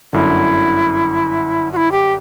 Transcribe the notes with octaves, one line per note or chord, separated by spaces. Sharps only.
G1 F#2 D3 E4
F#4
E4
G4